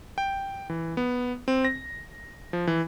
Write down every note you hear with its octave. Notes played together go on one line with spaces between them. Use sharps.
G5
E3
B3
C4
A#6
F3
E3